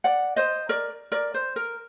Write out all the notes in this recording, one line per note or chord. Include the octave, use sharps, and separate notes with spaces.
D5 F#5
C5 D#5
A#4 D5
A#4 D5
C5
A#4